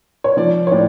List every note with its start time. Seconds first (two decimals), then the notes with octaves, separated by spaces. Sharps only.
0.24 C#5
0.37 F3 D5
0.67 C#5
0.72 A2 D5